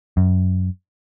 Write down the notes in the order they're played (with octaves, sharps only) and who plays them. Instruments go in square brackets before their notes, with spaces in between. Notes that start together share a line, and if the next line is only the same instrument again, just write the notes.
[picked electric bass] F#2